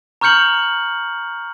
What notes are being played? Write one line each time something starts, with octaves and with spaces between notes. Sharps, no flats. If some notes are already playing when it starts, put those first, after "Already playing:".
A#5 C#6 F6 G6 C#7 F#7